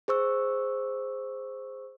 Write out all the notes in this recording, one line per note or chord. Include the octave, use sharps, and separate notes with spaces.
G#4 C5 C#6 E6